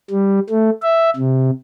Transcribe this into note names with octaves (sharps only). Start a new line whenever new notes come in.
G3
A3
E5
C3